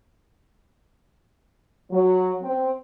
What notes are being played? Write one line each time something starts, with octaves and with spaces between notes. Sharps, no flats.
F#3
C4